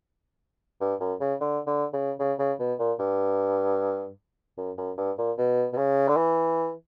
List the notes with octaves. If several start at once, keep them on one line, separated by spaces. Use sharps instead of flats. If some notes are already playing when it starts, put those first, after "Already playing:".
G2
F#2
C#3
D3
D3
C#3
C#3
C#3
B2
A#2
G2
F#2
F#2
G2
A#2
B2
B2
C#3
D3
E3